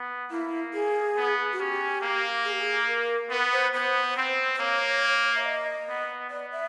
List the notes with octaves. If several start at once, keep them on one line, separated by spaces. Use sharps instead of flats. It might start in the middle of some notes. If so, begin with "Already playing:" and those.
Already playing: B3
A#3 E4
G#4
B3
F#4
C#4 G4
A#3
G#4
G4
G#4
A#4
B3 B4
C5
B3 C5
C4
C5
A#3 C#5
E5
D#5
B3
B3 D5
E5